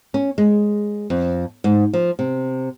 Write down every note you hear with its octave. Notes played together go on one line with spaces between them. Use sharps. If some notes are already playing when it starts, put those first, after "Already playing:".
C#4
G#3
F2
G#2
F3
C3